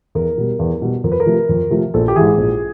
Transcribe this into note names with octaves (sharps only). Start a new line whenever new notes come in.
E2 A#4
B2 G3
E2
B2 G3
F2 A#4
B4
A#4
C3 F3 A3
F2
C3 F3 A3
A#1 A4
G4
G#2 E3 G#4
A#1